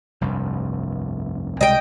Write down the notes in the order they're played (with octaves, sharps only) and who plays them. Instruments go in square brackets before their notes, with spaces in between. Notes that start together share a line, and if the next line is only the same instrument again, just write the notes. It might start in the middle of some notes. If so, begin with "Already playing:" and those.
[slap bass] F1 C2 G2
[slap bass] C2 B2 G#3 [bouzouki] D#5 G5